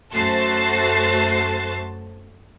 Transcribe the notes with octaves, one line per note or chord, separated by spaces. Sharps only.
F#2 A3 F#4 C5 A5 C7